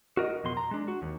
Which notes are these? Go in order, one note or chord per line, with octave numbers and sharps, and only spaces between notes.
F#4 A#4 D#5
F2 B2 C6
A#5
G#3 D4
F#4
D#2